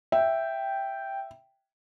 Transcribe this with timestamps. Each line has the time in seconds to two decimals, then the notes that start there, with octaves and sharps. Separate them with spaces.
0.12 E5 G5